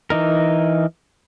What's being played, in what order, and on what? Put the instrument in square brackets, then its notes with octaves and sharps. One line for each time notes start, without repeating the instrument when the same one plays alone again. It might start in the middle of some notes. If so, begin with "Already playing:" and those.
[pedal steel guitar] E3 D#4 A#4